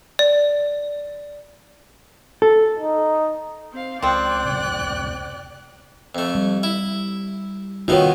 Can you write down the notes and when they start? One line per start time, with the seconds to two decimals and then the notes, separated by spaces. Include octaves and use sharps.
0.19 D5
2.42 A4
2.79 D#4
3.72 C4 F5
4.02 C#2 F3 C4 D5 G5 F#6
4.45 F1 C#2 C3
6.15 F2 A3
6.35 G3
6.63 E4
7.88 A2 D#3 B3 F4 F#4 C#5